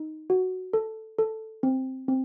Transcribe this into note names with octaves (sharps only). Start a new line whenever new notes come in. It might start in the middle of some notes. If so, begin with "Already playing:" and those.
Already playing: D#4
F#4
A4
A4
C4
C4